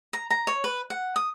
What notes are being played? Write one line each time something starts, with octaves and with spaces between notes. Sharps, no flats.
A#5
A#5
C#5
B4
F#5
D#6